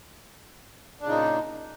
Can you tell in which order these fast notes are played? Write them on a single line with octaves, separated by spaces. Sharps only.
D4 C#3 A#2 D#4